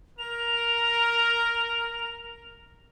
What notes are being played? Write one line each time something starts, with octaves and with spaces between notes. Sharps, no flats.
A#4 F7